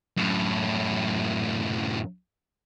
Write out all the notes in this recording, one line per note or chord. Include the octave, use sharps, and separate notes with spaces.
F#2 A2